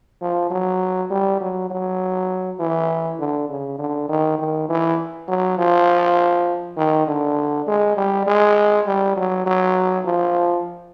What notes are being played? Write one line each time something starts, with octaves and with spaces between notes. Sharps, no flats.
F3
F#3
G3
F#3
F#3
E3
D3
C#3
D3
D#3
D#3
E3
F#3
F3
D#3
D3
G#3
G3
G#3
G3
F#3
F#3
F3